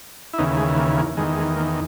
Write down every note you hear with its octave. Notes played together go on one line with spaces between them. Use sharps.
E4
D#2 C#3 E3 B3 D#4
G#3
A#3
A#3
E2 D#3 G#3
G#3
A#3